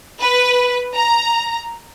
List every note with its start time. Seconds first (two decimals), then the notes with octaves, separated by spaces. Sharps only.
0.22 B4
0.95 A#5